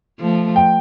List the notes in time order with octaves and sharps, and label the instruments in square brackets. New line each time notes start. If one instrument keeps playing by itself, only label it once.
[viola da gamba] F3 A3
[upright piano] G5